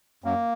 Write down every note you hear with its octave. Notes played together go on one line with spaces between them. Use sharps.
F#2 A#3